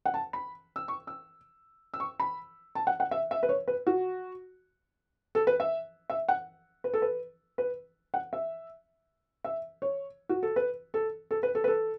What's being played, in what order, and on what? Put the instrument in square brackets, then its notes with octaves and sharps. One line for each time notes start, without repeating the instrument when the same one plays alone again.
[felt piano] F#5
A5
B5
E6
C#6
E6
E6
C#6
B5
A5
F#5
F#5
E5
E5
B4
C#5
B4
F#4
A4
B4
E5
E5
F#5
B4
A4
B4
B4
F#5
E5
E5
C#5
F#4
A4
B4
A4
A4
B4
A4
B4
A4